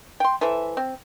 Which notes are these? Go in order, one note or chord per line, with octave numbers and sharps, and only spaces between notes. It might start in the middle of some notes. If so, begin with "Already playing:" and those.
G5 C6
E3 A4 C5 E5
C4